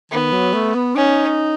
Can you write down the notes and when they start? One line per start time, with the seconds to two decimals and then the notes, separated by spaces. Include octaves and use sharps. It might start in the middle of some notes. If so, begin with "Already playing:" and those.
0.12 D#3 B3
0.33 F#3
0.54 A3
0.74 B3
0.96 C#4 D#4